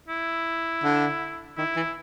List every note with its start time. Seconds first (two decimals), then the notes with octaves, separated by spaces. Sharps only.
0.09 E4
0.83 D3
1.57 D#3 E4
1.76 E3